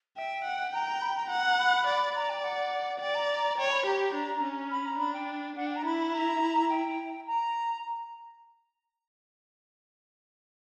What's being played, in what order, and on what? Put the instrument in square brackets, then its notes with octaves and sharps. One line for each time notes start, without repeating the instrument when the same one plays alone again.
[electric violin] E5 [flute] G5
[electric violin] F#5
[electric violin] G5 [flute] A#5
[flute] A#5
B5
A#5
[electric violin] F#5
[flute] B5
[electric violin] D5
[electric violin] D5 [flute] A#5
[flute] G5
F#5
[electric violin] D5 [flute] G5
[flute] A#5
[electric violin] C#5 [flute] G5
[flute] B5
[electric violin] G4 [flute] A#5
[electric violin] D4
C#4
[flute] B5
A#5
[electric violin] D4 [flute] B5
[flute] G5
[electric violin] D4 [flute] F#5
[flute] G5
A#5
[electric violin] E4 [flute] B5
[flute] B5
A#5
[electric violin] E4
[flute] G5
A#5